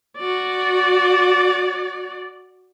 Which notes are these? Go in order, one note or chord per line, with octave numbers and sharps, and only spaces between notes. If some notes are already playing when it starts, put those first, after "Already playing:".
F#4 D5